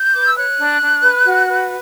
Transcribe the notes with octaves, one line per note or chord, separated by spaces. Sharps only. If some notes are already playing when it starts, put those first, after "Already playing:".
Already playing: G6
B4 D6
E6
C#5 F#6
D4
D4
B4
F#4
B4